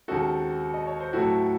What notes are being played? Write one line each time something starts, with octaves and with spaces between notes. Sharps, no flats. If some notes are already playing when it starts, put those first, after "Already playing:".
D#2 C#3 G#3 C4 D#4 F#4 A4
D#5
C#5
C5
A2 F#3 A3 C4 E4 F#4 A4